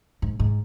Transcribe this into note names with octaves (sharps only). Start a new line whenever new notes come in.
G#2
G#2